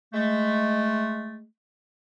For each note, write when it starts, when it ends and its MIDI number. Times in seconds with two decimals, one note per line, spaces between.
0.13 1.44 56
0.13 1.44 57